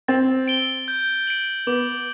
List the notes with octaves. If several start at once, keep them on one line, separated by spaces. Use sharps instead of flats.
C4 A6
D7 G7
G6
D7 F#7
B3 D6